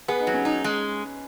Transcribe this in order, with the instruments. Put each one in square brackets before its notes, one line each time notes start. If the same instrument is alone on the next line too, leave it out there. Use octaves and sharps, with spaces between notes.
[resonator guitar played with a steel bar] B3 [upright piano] G#4 B4
[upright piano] D#4
[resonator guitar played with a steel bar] F#3
[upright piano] C#4
[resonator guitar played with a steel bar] D#4
G#3